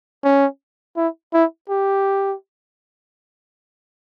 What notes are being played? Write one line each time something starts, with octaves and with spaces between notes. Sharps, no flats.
C#4
E4
E4
G4